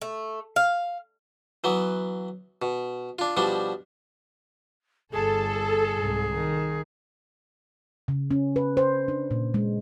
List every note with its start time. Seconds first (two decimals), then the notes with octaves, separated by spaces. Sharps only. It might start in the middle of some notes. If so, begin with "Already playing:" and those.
0.01 A3
0.56 F5
1.64 E3 F#3 B3
2.62 B2
3.19 D4 F4
3.37 B2 F3 G3 D4
5.12 G1 G#4 A4
5.98 C2 G#2
6.33 D#3
8.08 C#3
8.31 C#4
8.56 B4
8.77 C5
9.08 D4
9.31 A#2
9.54 G#3